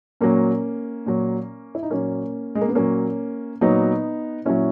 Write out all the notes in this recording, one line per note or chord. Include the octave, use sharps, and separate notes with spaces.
A#2 F#3 A#3 C#4
A#2 F#3
E4
D#4
A#2 F#3 A#3 C#4
G#3
A#3
B3
A#2 F#3 A#3 C#4
A#2 F#3 B3 D#4
A#2 F#3 C#4 E4